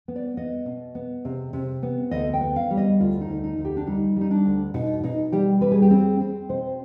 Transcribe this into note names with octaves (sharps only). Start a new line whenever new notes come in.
B3
D5
B3 D#5
B2
B3
C3
C3
B3
D2 D#5
G5
B3
F5
G3
D#5
D2 F4
D#4
D2
D#4
D2
G4
D4
G3 D#4
G3 D#4
D4
D2
B2 D#4
B2 D#4
G3 G4
G3 B4
G#4
G4
C4 G#4
C4
B2 C5